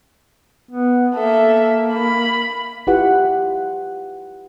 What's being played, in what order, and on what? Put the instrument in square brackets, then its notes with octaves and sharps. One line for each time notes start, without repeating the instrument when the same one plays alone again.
[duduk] B3
[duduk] A#3 [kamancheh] A4 E5
[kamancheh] B5
[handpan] E4 F4 G4 B4 F#5